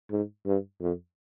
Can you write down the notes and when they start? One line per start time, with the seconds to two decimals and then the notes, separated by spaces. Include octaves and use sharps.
0.11 G#2
0.46 G2
0.81 F2